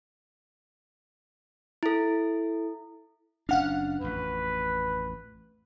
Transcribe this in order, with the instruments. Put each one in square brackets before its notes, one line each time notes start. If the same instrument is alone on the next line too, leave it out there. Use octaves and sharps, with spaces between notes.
[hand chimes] E4 A4
[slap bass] F#1 C#4 D4 [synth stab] F5 F#5 F6
[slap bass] A1 F2 [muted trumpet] B4